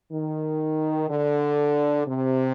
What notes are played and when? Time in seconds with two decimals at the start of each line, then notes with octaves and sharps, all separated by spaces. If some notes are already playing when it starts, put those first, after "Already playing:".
0.12 D#3
1.09 D3
2.07 C3